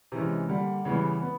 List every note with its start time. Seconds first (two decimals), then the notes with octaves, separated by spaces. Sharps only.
0.12 C3 E3 G#3 C#4
0.48 D3 G3 A#3
0.85 C#3 E3 G3 B3
1.21 B3